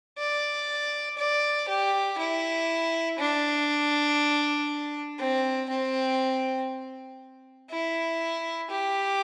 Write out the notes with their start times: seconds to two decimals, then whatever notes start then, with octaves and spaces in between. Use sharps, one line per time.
0.18 D5
1.18 D5
1.68 G4
2.18 E4
3.19 D4
5.19 C4
5.69 C4
7.71 E4
8.70 G4